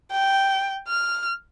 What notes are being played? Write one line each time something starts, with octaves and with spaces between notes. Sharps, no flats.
G5
F6